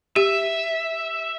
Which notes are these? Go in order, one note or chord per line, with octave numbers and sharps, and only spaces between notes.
G4 E5